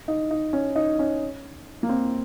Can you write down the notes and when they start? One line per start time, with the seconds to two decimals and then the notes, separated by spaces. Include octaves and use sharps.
0.08 D#4
0.31 D#4
0.53 C#4
0.76 D#4
0.99 C#4
1.83 A#3
1.89 C4